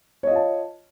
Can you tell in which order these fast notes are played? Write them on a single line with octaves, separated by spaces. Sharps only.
C#5 D#5 F4 A5